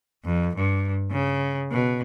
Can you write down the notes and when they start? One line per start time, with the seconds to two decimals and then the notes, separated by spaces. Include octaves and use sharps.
0.25 F2
0.56 G2
1.11 C#3
1.71 B2